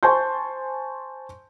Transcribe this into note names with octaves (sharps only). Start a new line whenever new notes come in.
C5 G#5 A5 C6 C#6 G6